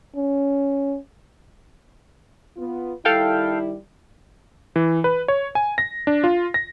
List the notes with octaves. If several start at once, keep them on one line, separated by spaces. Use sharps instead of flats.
C#4
B3 F4
D#3 G3 E4 A4 F5 G5
E3
B4
C#5
G#5
A#6
D4
F4
A#6